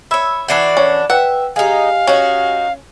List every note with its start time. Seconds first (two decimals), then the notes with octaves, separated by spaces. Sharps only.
0.11 C#5 E5 B5 E6 G#6
0.48 E3 D4 F#4 E5 C7
0.77 C#4
1.10 B4 E5 F#5 G5
1.56 G#3 D#4 G4 D#5 F5 G#5
2.07 C#4 D#4 F#4